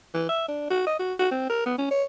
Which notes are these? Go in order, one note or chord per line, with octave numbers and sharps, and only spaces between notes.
E3
E5
D4
F#4
D#5
F#4
F#4
C4
A#4
B3
C#4
C#5